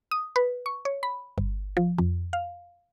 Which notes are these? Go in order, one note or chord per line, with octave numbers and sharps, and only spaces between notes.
D#6
B4
C#6
C#5
B5
G1
F3
F2
F5